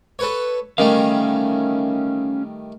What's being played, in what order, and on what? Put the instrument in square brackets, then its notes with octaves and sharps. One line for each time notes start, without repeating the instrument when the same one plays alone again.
[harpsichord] A4 B4 C#5
[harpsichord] D#3 G3 A3 [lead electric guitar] C#4 F5